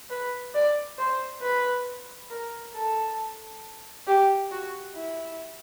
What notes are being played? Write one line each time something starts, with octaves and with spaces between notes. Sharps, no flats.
B4
D5
C5
B4
A#4
A4
G4
F#4
E4